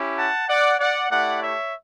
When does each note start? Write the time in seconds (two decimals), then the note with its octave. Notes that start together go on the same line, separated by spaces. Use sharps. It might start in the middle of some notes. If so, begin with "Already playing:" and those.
Already playing: C#4 E4 G4
0.17 F#5 A5
0.48 D5 F#5
0.78 D5 F#5
1.10 A3 E4 G4 D5 F#5
1.40 C#5 E5